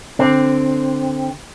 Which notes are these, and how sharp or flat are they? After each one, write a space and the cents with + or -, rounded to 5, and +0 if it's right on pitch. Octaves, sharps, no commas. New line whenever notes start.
D3 +0 C4 +0